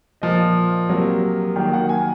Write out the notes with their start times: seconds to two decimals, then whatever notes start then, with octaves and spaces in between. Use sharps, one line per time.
0.22 A#2 F3 A#3 D#5
0.89 C3 F#3 A#3
1.56 D#3 F#3 A#3
1.73 F#5
1.89 G#5